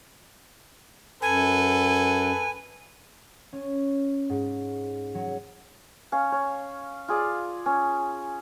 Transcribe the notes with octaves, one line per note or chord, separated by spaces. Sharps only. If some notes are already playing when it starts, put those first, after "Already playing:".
F#2 A4 B4 G#5
C#4
G#2
F#3
C#4 F5
C#5
F4 G#4 D5
C#4